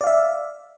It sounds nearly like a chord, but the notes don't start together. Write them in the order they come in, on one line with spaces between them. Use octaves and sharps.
D5 F5 E5